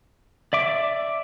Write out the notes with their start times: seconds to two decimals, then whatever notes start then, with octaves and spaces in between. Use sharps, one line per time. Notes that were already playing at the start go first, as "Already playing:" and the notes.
0.53 D5 E5 D6